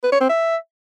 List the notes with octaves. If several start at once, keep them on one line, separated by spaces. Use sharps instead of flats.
B4
C#5
C4
E5